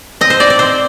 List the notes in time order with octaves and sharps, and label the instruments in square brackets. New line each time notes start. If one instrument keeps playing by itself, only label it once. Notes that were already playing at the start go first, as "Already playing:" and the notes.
[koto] C4 D#5
C5
C4 D5
D5
C4 C5